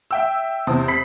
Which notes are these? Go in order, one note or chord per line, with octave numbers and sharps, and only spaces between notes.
E5 G5 E6
E2 C3 C5 A5 D#6
B5 B6 C7